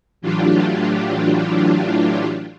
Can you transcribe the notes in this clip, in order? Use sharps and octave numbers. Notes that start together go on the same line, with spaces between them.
A2 E3 F#3 D4 F4 G4